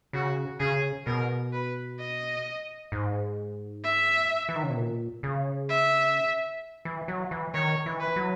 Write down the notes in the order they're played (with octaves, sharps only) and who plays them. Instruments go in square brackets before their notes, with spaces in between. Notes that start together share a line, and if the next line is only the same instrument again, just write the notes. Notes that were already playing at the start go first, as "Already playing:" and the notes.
[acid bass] C#3 [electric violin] F#4
[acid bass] C#3 [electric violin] G#4
[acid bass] B2 [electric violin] A#4
[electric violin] B4
D#5
[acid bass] G#2
[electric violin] E5
[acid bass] E3
D#3
C#3
B2
A#2
C#3
[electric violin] E5
[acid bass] E3
F#3
E3
[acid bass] D#3 [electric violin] C#5
[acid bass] E3
[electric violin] B4
[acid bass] F#3